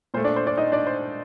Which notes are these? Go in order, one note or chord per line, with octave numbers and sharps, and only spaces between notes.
A#2 A3 C5
D4 D5
C5
D4 D5
D#4 D#5
D4 D5
C5